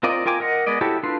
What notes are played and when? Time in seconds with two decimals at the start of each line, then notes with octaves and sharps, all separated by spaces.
0.03 C4 F4 A#4 D5 D#5
0.26 F4 A#4 G5 G#5 D6
0.40 A#4 D#5 F#5
0.67 G#3 B3 D5 D#5
0.81 E4 F#4 G4 A4 C#5
1.03 D4 F4 A4 B4 C6